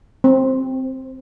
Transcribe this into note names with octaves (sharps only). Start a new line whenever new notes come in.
C4